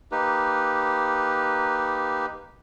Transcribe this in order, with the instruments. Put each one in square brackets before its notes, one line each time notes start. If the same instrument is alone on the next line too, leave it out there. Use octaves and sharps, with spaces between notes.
[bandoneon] A#3 D#4 G4 B4